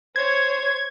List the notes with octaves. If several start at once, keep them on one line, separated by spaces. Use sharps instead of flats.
C5 C#5 G#6